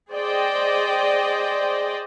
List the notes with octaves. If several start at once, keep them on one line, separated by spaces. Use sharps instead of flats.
G#4 C5 D5 D#5 G5